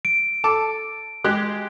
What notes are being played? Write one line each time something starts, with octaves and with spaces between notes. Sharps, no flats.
D7
A4 A5 D6
G#3 G4 F#6